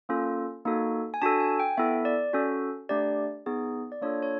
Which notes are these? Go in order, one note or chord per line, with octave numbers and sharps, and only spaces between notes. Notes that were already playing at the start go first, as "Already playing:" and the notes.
A#3 C#4 F4 A4
A#3 D#4 F#4 A4
G#5
D4 F#4 A4 A5
G#5
G5
B3 E4 A4 E5
D5
C#4 F#4 A4
A3 D4 G4 D5
B3 D#4 G#4
D5
A#3 D4 F4 A4 C#5
C#5